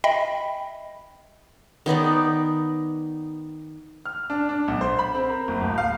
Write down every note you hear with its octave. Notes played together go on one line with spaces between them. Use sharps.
D#5 E5 G5 B5
D#3 B3 D#4 D5
F6
D4
D4
B1
C5
B5
C4
A#4
F#1
D1
F5